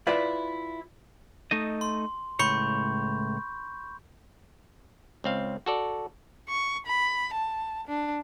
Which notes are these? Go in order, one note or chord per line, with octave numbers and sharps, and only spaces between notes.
E4 F4 B4 D5 E5
A3 D#4 D#5
C6
C#2 A2 C#5 B5 C#6 G6
C#2 C4 F5
F#4 A4 D5
C#6
B5
A5
D4